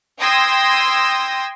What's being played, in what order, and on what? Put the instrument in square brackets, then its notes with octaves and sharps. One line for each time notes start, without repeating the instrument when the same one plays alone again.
[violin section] G5 C6 D#6 E6 G#6 A#6